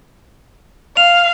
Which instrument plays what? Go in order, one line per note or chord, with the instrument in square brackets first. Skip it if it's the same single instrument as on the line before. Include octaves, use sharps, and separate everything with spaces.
[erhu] F5 [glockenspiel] F7